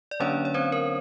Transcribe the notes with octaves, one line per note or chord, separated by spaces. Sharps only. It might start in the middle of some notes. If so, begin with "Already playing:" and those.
D5
D3 F#3 A#3 C#4 D4 C#5
C#5
C4 C5
A#4